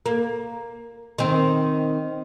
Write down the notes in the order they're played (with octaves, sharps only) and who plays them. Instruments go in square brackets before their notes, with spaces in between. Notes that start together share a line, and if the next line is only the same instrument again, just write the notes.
[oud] A#3
D#3 C4